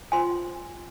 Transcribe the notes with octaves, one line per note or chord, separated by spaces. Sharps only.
F4 C5 G#5 C6